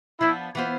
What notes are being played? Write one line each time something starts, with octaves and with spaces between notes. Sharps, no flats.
F3 B3 D4 E4
E3 B3 F4 C5